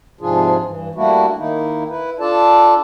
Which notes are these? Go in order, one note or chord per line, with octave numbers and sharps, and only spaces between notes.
G#2 C3 F3 D4 F4 G#4
G2 E3
G3 A3 A#3 D4 E4 F#4
D#3 A#3 D#4 E4
E4 B4
D4 F4 A4 D5 A5